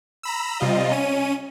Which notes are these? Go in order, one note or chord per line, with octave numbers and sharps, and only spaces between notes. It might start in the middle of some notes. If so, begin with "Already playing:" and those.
A#5 B5 E6
C3 G3 F4 D#5
C#4 D#7